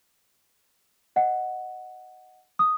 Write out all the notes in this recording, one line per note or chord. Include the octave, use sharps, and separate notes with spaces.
D#5 F#5
D#6